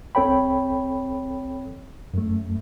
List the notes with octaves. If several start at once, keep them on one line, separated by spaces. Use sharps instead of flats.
C2 C4 A4 C#5 G5 B5
F#2 A3